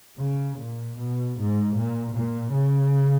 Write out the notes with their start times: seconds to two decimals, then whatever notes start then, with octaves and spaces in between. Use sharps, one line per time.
0.19 C#3
0.58 A#2
0.98 B2
1.37 G#2
1.75 A#2
2.14 A#2
2.53 C#3